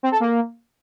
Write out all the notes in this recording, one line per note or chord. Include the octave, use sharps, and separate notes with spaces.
C4
A4
A#3